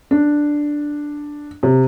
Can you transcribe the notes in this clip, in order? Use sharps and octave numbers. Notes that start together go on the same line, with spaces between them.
D4
C3